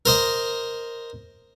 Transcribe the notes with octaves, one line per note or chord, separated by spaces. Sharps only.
A#4 C5 D#5